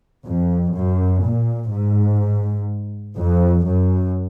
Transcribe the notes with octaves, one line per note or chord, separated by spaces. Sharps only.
F2
F#2
A#2
G#2
F2
F#2